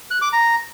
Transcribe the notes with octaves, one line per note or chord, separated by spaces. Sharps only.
F#6
D6
A#5